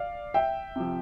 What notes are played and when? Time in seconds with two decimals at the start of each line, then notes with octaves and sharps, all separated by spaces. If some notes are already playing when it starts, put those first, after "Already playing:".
Already playing: D5 F5
0.34 E5 G5
0.76 C3 F3